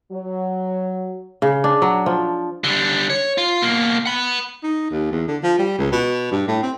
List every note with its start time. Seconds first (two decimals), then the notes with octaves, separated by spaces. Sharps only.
0.12 F#3
1.42 C#3
1.64 D4
1.82 F#3
2.06 F3
2.64 D3 G3
3.10 C#5
3.38 F4
3.62 B2 A#3
4.06 F#5 B5
4.63 D#4
4.91 D#2
5.12 E2
5.28 D3
5.43 F3
5.59 G3
5.78 C#2
5.92 B2
6.31 G2
6.48 A2
6.63 C4